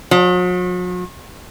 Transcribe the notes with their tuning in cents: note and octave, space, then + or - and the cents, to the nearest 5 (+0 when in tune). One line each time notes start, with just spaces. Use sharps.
F#3 -45